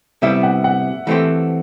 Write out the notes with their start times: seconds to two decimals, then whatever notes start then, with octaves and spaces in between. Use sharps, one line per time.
0.22 C3 G3 B3 E4 E5
0.43 F#5
0.64 F#5
1.07 E3 A3 C4 G4 C5